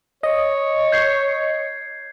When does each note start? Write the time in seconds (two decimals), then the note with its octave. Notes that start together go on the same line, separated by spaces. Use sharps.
0.23 C#5 D#5
0.92 G6 G#6 C7